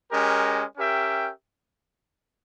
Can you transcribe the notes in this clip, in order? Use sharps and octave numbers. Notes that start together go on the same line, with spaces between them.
G#3 C#4 G4 A#4
C#4 G4 A#4 E5 G5